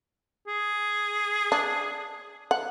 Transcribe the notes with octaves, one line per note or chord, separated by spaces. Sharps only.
G#4
D4
F#5